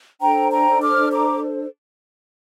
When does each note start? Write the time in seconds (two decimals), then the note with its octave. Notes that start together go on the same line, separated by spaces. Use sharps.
0.21 D4 A4 C5 G5 A#5
0.52 G5 A#5
0.81 D6 F6
1.11 A#5 D6